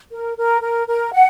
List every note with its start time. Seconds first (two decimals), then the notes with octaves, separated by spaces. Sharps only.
0.11 A#4
0.37 A#4
0.62 A#4
0.88 A#4
1.14 F#5